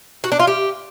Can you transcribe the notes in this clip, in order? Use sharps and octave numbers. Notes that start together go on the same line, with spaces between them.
F#4
D4
F4
G4